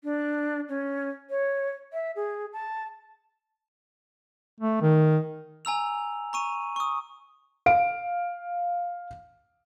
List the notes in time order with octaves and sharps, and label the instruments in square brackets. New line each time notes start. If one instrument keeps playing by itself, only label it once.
[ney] D4
C#4
C#5
E5
G#4
A5
[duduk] A3
D#3
[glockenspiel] G#5 A#5 E6 F7
A#5 C#6 D#7
C#6 D#6
[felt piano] F5 D7